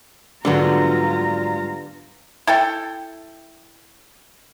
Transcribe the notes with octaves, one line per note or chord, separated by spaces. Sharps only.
G#2 D3 F#3 G3 B3 F4 A#5
E4 A4 G5